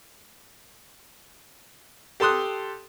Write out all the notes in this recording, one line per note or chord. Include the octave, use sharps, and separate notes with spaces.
G4 A4 A5 C6 D#6 F#6